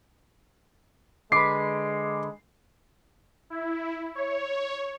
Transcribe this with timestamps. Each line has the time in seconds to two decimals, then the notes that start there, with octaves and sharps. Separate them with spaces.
1.32 D3 G#3 B4 D6 C7
3.50 E4
4.15 C#5